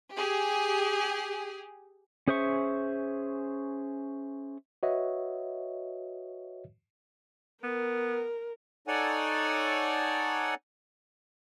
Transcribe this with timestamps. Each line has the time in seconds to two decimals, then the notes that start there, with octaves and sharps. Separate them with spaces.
0.16 G4 G#4
2.28 C#4 G#4 C5 E5 C#6
4.83 F#4 B4 C#5 D#5 E5
7.64 B3 A#4
8.87 D#4 A4 C#5 D5 F#5 G#5